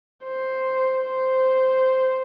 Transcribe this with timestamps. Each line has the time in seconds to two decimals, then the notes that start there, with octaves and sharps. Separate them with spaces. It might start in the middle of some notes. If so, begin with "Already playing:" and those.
0.23 C5
1.03 C5